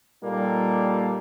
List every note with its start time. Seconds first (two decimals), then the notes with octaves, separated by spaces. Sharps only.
0.24 A#2 G3 A#3 D#4 A4